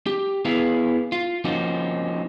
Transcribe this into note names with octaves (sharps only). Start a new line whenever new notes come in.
G4
B3 E4 G#4 B4 F5
F4
F3 A#3 C4 C#4 D#4 F#4